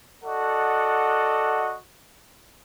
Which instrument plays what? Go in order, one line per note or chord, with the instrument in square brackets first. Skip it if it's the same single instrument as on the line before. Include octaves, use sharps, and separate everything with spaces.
[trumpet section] F#4 A4 D5 D#5 F#5